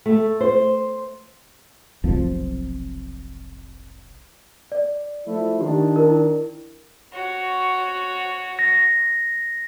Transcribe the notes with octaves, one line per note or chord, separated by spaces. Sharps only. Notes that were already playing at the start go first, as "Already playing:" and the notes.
A3
C5
F1 B1 F2 F3
D5
F3 A3 E4
D#3 D4 G4
E4 A#4
F#4 C#5
A#6